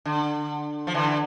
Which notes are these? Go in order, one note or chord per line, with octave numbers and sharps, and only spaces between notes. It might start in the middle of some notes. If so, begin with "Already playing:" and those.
D3
F3
D3 E3